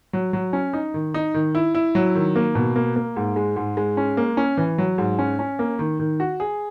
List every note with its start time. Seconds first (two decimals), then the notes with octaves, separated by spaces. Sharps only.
0.13 F#3
0.33 F#3
0.53 C#4
0.73 D#4
0.94 D#3
1.14 D#4
1.34 D#3
1.55 E4
1.75 E4
1.95 F#3
2.15 D#3
2.36 A#3
2.55 B2
2.76 A#3
2.96 A#3
3.16 G#2
3.36 G#3
3.56 G#2
3.77 G#3
3.97 C#4
4.17 A#3
4.37 C#4
4.57 E3
4.78 F#3
4.98 G#2
5.19 C#4
5.39 C#4
5.59 A#3
5.79 D#3
5.99 D#3
6.20 F#4
6.40 G#4